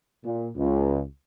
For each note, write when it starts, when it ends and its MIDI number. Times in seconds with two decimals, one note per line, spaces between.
0.24 0.48 46
0.56 1.00 37